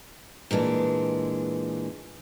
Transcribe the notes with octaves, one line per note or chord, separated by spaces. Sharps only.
A#2 E3 G#3 D4